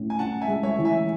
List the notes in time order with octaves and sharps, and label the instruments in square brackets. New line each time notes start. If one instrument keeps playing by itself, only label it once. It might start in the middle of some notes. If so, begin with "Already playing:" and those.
Already playing: [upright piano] A2 C#4
[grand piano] G#5
[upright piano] C#4 [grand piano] F#5 A5
[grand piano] E5 G#5
[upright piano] G#3
[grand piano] C#5 E5
[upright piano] E3
[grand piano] E5 G#5